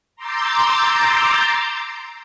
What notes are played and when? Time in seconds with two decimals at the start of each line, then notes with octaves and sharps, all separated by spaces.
0.16 A#5 C6 D6 E6 G6 A6